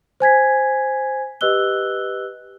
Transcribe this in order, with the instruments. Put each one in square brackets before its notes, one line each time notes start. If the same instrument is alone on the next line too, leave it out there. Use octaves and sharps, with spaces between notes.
[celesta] C5 G#5 G#6 B6
G4 B4 D#5 E6 F#6 G7